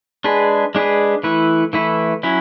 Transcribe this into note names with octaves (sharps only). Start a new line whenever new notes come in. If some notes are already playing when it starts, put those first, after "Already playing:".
G#3 D4 G#4 B4
G#3 D4 G#4 B4
E3 A3 E4 B4
E3 A3 E4 B4
F#3 C#4 E4